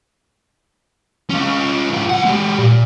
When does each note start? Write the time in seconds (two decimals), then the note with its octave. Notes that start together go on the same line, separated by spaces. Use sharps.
1.30 C#4 F4
1.90 G#2 F4
2.10 B1 F#5
2.25 G#3 G4
2.59 A#2